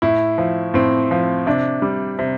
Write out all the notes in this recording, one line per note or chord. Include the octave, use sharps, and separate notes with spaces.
A2 E4
F3
A2 C4
F3
C3 D4
G3
C3